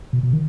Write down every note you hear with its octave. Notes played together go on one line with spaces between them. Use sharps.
B2
B2
D#3